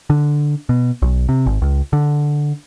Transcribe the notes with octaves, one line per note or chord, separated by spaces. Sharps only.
D3
B2
B1
C3
G#1
C#2
D3